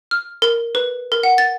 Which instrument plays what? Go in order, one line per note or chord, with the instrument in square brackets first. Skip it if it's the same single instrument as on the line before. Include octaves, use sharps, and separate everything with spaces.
[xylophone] F6
A#4
B4
A#4
F#5
A6